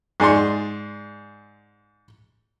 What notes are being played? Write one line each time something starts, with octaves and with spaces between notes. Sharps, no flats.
G#2 G#4 D5 C6